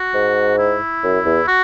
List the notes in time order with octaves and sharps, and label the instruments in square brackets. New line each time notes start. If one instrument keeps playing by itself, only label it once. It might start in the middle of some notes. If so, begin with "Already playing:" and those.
Already playing: [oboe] F#4
[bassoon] G#2
[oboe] E4
[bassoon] F#2
E2
[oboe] F#4